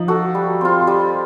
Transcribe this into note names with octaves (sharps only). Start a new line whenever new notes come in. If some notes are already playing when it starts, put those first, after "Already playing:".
Already playing: F3 D#4
F#4 A4
G3
C4 F4
G3